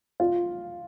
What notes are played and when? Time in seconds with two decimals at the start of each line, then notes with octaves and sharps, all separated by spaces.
0.20 F4